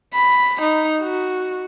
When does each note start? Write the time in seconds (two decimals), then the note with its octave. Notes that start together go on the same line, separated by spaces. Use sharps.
0.14 B5
0.62 D#4
1.01 F#4